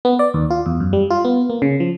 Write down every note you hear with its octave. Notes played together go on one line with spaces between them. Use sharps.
B3
D5
D#2
F4
E2
F#2
G3
F4
B3
A#3
C#3
F3